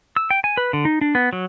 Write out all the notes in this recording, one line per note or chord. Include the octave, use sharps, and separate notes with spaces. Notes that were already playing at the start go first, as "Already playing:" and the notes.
E6
G5
G#5
B4
D3
D#4
D4
B3
F#3